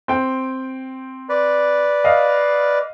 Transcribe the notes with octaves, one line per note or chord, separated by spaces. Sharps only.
C4 G5
B4 D5
D#5 F5